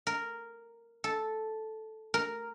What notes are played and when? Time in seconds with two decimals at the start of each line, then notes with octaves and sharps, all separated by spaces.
0.07 A#4
1.04 A4
2.14 A#4